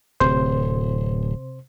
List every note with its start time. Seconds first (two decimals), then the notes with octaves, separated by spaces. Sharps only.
0.20 D1 C3 C5